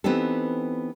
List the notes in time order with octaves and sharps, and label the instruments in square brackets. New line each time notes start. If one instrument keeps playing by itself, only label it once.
[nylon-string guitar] E3 B3 C4 D#4 G4 A4